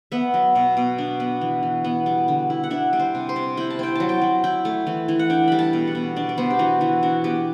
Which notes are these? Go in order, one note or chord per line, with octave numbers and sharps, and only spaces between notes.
B3 E5
F#3
B2
B2
D4
B3
E3
E3
B3
G3
D3
E4
F#5
D4 E5
G3
C5
C3
C5
C3
E4 G5
A5
C4 G5
F#3 A5
G5
F#3
E4 G5
A3
E3
E3
F#5
D4 G5
G3 B5
A5
B2
F#5
B2
D4 D5
D5
B3 C5
G4
E3 F#4
E3 F#4
D4 F#4
B3 G4